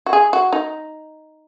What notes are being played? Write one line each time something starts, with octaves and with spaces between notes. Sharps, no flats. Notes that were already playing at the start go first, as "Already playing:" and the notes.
F#4
G#4
F#4
D#4